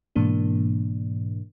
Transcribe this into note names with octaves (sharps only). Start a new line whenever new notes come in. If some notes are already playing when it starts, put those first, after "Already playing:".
G#2 B2 E3 A#3 D4